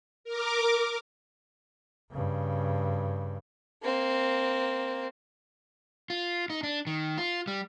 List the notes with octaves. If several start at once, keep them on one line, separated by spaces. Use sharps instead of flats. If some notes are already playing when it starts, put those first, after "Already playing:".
A#4 D6
G2 C#3
A#3 C4
F4
D#4
D4
D#3
F4
G3